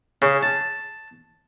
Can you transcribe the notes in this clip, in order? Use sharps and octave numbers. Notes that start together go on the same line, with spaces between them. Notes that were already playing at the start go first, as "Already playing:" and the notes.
C#3
A5